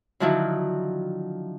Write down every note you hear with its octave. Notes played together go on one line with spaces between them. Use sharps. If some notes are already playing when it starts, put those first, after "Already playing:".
D3 D#3 F3 F#3 D4 E4